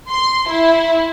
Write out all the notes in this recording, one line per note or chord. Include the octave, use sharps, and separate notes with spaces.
C6
E4